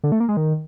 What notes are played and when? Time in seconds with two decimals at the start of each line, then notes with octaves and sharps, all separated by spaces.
0.04 D3
0.12 A3
0.20 A#3
0.29 G#3
0.37 D#3